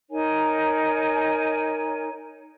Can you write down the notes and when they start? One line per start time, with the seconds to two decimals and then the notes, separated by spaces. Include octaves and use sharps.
0.10 D#4 A#4 C#5 G#5